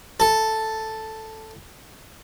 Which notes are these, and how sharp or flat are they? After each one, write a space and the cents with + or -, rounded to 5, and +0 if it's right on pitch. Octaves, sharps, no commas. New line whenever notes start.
A4 +0